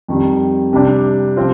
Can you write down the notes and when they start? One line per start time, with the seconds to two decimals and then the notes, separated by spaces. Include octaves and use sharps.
0.08 F2 D#3 G3
0.73 C3 G3 D4 G4
1.36 C3 F3 C4 F4